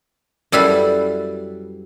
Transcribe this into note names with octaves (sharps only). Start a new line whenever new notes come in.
F#2 G3 E4 A4 B4 F5